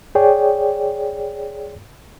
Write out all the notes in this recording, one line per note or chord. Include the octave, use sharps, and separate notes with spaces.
G#4 C#5 D5 G5